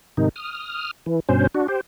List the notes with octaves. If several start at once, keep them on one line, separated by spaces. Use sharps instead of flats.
G#2 C3 D#3 D#4
D#6 F6
E3
G2 B2 C#4 C5
D4 F#4
G4 C5